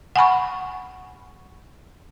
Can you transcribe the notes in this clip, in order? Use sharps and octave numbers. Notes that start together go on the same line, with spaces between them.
F#5 G#5 B5 C#6